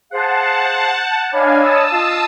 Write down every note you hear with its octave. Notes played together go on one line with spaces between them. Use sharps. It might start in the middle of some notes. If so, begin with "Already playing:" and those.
G#4 C5 F5 F#5 A5
G6
D4 C#5 D#5 F5 G#5 B5
A5 D#6 E6
F4 D#5